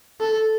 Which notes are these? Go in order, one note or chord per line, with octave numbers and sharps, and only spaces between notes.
A4